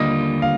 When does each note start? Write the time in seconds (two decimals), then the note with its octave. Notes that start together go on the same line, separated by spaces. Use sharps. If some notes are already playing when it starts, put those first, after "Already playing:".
Already playing: D#2 D3 G3 A#3 F4 D#5
0.42 F5